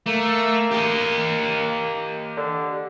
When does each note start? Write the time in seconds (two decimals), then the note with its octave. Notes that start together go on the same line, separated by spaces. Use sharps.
0.06 A3 A#3
0.71 G4 D#5
2.37 D3